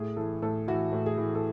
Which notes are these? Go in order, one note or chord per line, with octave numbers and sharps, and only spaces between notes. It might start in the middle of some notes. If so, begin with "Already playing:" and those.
Already playing: A2 G#4
E3 A4
A2 A4
E3 F#4
A2
G#4
E3
A4